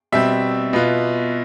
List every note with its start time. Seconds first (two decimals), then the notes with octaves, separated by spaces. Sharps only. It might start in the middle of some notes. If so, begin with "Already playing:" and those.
0.12 B2 G3 C4 E5
0.73 B2 B3 F4